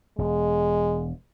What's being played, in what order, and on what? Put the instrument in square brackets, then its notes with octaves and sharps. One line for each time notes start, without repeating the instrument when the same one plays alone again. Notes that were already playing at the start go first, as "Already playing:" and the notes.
[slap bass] E1 [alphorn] G#3